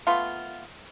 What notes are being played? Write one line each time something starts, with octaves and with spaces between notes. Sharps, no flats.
A3 B3 F4